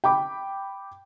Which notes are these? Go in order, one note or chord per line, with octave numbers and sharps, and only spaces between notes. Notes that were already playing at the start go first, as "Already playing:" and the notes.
G5 B5 D6